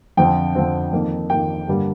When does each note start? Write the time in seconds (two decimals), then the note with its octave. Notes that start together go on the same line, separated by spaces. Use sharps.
0.17 F2 D3 F3 C4 G5
0.55 F2 D3 F3 C4
0.93 F2 D#3 A#3
1.30 F2 D#3 A#3 G5
1.68 G2 D3 G3 A#3